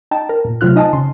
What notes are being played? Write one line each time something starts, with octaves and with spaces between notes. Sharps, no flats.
D#4 G5 A5
A#4
A#2
C3 F#3 A3 F4 F6 F#6
C4 D#4 D#5 G#5 A5
C#3 C6